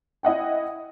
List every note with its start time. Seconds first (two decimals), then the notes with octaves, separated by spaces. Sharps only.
0.23 E4 D#5 F#5 G5